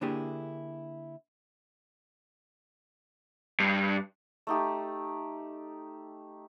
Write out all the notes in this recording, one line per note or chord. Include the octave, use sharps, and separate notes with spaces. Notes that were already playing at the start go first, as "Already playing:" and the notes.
D3 A#3 D4 E4 G4 G#4
G2
A3 D#4 G4